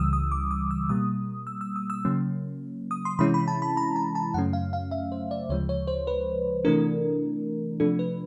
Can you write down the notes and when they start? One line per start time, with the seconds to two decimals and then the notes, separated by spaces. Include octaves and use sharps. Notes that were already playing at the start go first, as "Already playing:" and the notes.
Already playing: C#2 C#3 E3 G3 D#6 E6
0.13 D#6
0.31 D6
0.51 D#6
0.71 E6
0.89 B2 G3 A#3 D#6
1.47 E6
1.61 E6
1.76 D#6
1.90 E6
2.05 C#3 F#3 A#3 C#4
2.91 D#6
3.05 C6
3.19 C3 E3 G#3 C#4 E4 B5
3.34 B5
3.48 A5
3.62 B5
3.77 A#5
3.96 A5
4.15 A5
4.34 F#2 C#3 F#3 A3 C#4 F#5
4.53 F5
4.73 F5
4.91 E5
5.12 C5
5.31 D5
5.49 D2 C#3 F3 G#3 C#5
5.69 C#5
5.87 C5
6.07 B4
6.65 C3 E3 A3 D4 A#4
7.80 C3 F3 A3 D4 A4
7.99 B4